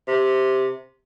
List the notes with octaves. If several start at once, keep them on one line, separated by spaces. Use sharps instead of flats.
C3